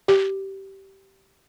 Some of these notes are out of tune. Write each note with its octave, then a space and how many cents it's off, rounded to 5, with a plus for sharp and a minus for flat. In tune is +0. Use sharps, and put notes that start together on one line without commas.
G4 -15